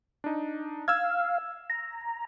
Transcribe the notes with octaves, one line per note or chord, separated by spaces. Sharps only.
D4 D#4
F5 E6 G#6
A#5